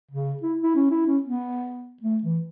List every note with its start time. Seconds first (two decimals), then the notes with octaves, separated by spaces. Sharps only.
0.11 C#3
0.42 E4
0.63 E4
0.75 C#4
0.91 E4
1.06 C#4
1.22 B3
2.02 A3
2.23 E3